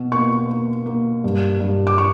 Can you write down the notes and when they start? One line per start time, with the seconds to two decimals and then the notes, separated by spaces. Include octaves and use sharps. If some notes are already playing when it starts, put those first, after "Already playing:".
Already playing: B2
0.12 A#3 C#6
0.49 A#3
0.86 A#3
1.24 G2
1.60 G2
1.87 D6
1.98 C#6